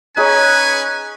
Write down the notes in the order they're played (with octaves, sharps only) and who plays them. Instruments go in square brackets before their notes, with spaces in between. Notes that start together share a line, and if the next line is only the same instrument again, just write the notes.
[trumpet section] C#4 B4 G#5 [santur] D#4 G#4 C#5